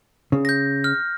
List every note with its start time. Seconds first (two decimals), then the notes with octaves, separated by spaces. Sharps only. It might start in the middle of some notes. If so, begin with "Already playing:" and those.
0.32 C#3
0.45 G6 A#6
0.84 F6